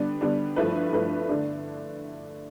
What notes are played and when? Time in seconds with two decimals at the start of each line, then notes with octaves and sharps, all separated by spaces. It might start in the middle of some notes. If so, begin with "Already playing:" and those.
Already playing: D3 G3 B3 D4
0.21 D3 G3 B3 D4
0.56 G2 F3 A3 E4 B4
0.93 G2 F3 A3 E4 B4
1.29 D3 A3 D4